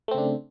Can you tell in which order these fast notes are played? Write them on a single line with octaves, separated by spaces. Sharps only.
A3 C4 C#3 D4